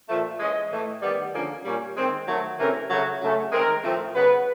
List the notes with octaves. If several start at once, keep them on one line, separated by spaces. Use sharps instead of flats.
A#2 F3 A3
E3 G#3 C#4 D#5
A2 E3 A3
D#3 G3 B3 D5
D3 F3 A#3 C#4 G#4
A#2 G3 A#3 C#4
D#3 G#3 C4
D#3 F#3 A3
C3 E3 A3 C#4 A#4
C#3 F#3 A3 F#4
C#3 F#3 A3 C#4
D#3 G#3 C4 A#4
A2 F3 A3 C4
C#3 F#3 B3 B4